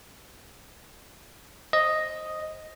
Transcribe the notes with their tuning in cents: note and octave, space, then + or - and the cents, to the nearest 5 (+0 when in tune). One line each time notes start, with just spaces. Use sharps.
C5 +20 D#5 +0